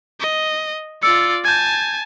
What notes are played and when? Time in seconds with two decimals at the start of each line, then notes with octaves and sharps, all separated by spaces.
0.20 D#5
1.03 F4 D5 E6 C#7
1.45 G#5 A5 G6 G#6